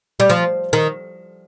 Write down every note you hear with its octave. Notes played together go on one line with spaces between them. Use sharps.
G3
F3
D#3